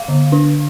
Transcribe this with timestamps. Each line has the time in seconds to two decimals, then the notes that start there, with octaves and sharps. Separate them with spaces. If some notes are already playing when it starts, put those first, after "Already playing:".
Already playing: F5
0.08 D3
0.32 D4